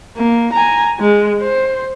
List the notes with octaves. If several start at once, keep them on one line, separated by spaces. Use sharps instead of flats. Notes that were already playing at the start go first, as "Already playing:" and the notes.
A#3
G#5 A#5
G#3
C5